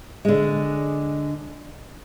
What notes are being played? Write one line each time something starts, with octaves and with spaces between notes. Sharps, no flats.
D3 G#3